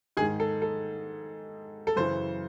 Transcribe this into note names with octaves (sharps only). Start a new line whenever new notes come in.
G#2 D#3 G#4
A4
A4
A4
F#2 C#3 E3 C5